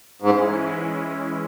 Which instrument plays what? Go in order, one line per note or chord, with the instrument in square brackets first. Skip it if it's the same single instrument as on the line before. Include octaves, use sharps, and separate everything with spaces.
[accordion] G#2 [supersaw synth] E3 G#3 C#4 E4